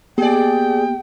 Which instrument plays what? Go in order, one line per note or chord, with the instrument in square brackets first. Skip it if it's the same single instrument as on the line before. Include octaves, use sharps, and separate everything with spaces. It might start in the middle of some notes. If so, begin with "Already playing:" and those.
[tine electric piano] A#3 B3 G4 [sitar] G#4 D5 [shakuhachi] G5